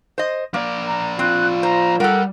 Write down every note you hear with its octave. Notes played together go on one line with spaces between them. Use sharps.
C5 D#5
F3 A#3 D5
A#5
C4 F4 F#6
C5 A#5
G3 A4 A#4 F#5